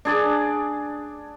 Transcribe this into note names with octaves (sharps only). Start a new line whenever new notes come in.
D4 G#4 D5